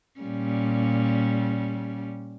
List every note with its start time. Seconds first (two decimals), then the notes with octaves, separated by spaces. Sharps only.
0.20 A#2 G3 C#4